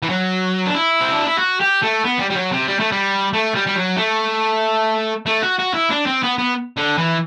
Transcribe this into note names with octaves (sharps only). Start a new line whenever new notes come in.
E3
F#3
D4
E4
C4
D4
E4
F#4
G4
A3
B3
G3
G3
F#3
C3
G3
A3
G3
A3
G3
G3
F#3
A3
A3
F#4
F#4
E4
D4
C4
B3
B3
D3
E3